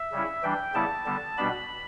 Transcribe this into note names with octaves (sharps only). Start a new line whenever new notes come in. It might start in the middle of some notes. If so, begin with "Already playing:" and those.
Already playing: E5
C#3 G3 C#4 E4
E3 G3 D4 G5
C#3 G3 B3 E4 A5
D3 G3 B3
B2 G3 B3 D4 B5